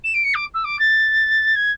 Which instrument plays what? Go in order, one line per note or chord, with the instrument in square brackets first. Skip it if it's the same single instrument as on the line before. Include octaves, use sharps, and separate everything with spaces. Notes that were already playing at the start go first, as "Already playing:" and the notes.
[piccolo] E7
D7
C#7
D6
E6
D6
A6
G#6